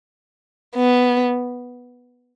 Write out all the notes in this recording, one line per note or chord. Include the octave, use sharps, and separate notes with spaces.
B3